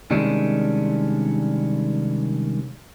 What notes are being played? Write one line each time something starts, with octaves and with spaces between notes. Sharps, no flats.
C3 D#3 G3 G#3 C#4 D4